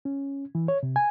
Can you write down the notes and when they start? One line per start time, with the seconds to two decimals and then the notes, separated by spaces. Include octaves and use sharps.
0.05 C#4
0.55 E3
0.68 C#5
0.83 C3
0.96 G#5